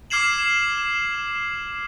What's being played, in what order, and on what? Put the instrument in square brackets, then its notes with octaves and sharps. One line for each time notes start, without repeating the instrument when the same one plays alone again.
[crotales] D6 F6 G#6 C7 E7 F#7